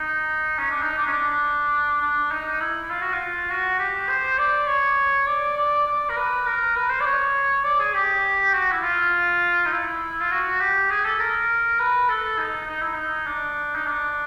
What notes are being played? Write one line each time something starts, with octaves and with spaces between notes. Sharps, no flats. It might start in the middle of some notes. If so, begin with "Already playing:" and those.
Already playing: D#4
C#4
D4
D#4
D4
C#4
D4
D4
D#4
E4
F4
F#4
F4
F#4
G4
C5
D5
C#5
D5
D5
D5
A#4
B4
A#4
B4
C5
D5
C#5
D5
G#4
G4
F#4
E4
F4
D#4
E4
F4
F#4
G4
G#4
A4
A#4
B4
A4
D#4
D#4
E4
D#4
D4
D#4
D4